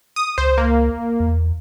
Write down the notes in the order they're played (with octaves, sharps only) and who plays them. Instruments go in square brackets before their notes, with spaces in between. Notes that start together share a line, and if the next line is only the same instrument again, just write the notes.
[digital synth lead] D#6
[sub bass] C#2 [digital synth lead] C5
[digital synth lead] A#3
[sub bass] E2